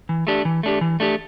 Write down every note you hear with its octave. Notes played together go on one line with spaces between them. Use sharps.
E3
A3 D4 G4
E3
A3 D4 G4
E3
A3 D4 G4